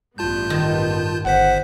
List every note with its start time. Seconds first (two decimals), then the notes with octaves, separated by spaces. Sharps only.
0.18 A1 G2 B3 F4 A5 G6
0.50 D#3
1.25 G1 C5 F#5 B6